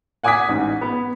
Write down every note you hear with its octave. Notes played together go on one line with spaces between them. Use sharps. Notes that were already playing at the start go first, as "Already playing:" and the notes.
F#5 G#5 D6 D#6 G#6 B6
A1 G#2
B3